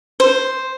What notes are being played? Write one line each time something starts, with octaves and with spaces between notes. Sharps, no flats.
C5